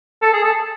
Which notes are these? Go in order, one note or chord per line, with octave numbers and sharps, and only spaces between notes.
A4
G#4
A4